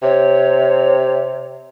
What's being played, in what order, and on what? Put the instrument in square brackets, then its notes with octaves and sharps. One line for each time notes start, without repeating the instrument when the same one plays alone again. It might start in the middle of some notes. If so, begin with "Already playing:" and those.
[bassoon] C3 [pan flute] C#5